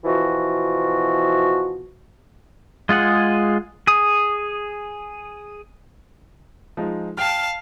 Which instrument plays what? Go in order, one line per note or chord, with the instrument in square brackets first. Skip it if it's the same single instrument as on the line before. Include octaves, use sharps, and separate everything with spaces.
[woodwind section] B2 E3 F3 F#4
[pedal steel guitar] G#3 F4 G#4 F#5
G#4 D#6
[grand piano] F3 G#3 D#4
[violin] F5 A5 [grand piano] G5 F6